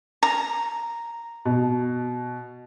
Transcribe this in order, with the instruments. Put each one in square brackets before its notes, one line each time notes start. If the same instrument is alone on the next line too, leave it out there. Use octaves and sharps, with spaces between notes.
[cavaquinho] A#5
[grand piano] B2